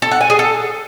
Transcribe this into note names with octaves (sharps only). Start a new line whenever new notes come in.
A4
F#5
G#5
G#4
A4